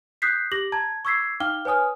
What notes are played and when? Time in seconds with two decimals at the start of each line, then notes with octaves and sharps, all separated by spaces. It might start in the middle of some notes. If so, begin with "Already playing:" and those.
0.22 D#6 F#6 G6 B6 C7
0.52 G4 D6 A#6 F#7
0.72 A5 A#5 G#6
1.05 C#6 D6 E6 G#6 B6 C7
1.40 D#4 F5 G5 D6 F6 G7
1.65 B4 C#5 G#5 D#6 F6